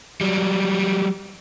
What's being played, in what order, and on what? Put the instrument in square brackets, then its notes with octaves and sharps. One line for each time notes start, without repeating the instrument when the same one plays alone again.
[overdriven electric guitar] F#3 G3